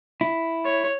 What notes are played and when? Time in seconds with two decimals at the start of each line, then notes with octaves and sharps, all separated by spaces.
0.21 E4
0.65 C#5